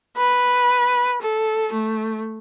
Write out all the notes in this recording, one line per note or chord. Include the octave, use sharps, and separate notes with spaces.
B4
A4
A3